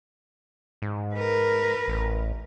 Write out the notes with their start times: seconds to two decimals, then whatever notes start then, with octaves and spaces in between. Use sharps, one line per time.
0.82 G#2
1.15 A#4 B4
1.88 A1